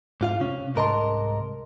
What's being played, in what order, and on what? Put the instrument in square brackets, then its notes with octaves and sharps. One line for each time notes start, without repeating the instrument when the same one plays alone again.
[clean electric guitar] G#2 F4 F5
C3 C#4
C2 G#2 A#4 D#5 A5 C6